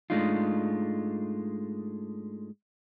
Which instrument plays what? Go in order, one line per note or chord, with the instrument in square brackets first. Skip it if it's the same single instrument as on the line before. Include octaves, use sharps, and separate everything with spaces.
[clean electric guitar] G#2 G#3 A3 D4 D#4 F4